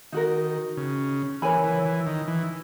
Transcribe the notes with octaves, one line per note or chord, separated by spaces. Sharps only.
D#3 D#4 F#4 A#4
C#3
E3 A#4 C#5 G#5 B5
E3
E3
D#3
E3